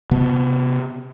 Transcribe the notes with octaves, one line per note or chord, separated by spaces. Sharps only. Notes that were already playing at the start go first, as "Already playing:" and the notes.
C3 B3